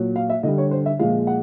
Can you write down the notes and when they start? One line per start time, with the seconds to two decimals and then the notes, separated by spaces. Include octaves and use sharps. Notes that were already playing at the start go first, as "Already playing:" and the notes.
Already playing: A#2 F#3
0.16 F5
0.30 E5
0.43 D3 G3 D#5
0.58 C#5
0.71 C5
0.86 E5
0.99 A#2 F3 G#3 F5
1.27 F#5